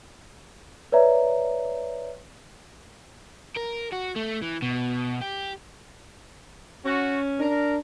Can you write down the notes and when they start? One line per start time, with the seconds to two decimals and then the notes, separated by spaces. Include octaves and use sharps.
0.92 B4 C#5 D5 E5 A#5
3.57 A#4
3.93 F#4
4.16 A3
4.42 E3
4.62 B2
5.22 G4
6.85 C#4 F#4
7.39 D4 A#4